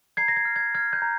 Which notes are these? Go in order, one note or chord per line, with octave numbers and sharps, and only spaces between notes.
A#5 G#6 C7
A#6
G#6
F6
G#6
F6 G#6
G6
A#5